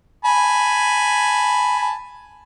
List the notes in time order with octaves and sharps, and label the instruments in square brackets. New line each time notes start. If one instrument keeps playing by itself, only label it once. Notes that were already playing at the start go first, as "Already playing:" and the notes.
[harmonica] G#5 A5 B5